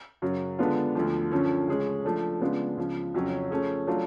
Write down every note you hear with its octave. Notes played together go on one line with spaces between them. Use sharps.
F#2 C#3 F#3
D3 G#3 B3 D4 F4
D2 D3 F3
F#2 D3 F3 A3 C#4
C#3 G#3 C#4 G#4
F3 A3 D4
C#3 G#3 B3 D4 F4
C#2 C#3 F3
F2 C#3 F#3 C#4
F3 A3 C#4 G#4
F#3 A3 D4 F4